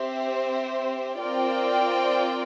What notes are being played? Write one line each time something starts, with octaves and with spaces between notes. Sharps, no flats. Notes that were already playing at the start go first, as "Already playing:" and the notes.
Already playing: C4 G4 C5 E5
C4 F4 A#4 D5 G5